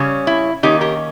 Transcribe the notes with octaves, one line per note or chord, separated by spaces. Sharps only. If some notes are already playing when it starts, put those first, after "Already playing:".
Already playing: C#3 G3 C#4
E4
D#3 A#3 C#4 D#4 G4
G4 A#4